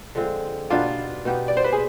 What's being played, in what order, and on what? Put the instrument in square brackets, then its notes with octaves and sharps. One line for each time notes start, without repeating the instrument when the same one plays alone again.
[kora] D3 F3 G#3 C4
[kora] B2 B3 D#4 G4 [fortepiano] D4 F4
[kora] B2 B3 D#4 G4
[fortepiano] D5
C5
B4
G#4